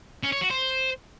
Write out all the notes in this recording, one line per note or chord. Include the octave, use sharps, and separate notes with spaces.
C#4
C#5
F#4
C5